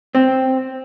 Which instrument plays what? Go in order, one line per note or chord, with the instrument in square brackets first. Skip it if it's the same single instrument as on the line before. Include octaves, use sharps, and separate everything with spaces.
[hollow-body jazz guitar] C4